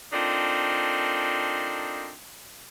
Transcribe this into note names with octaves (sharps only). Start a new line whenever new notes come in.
A3 C4 D4 D#4 F4 A#4